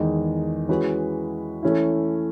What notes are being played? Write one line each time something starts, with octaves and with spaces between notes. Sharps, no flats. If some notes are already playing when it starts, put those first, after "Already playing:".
Already playing: E2 D#3 G#3 D#4
E3 G#3 C#4 F#4 B4
E3 A3 C#4 E4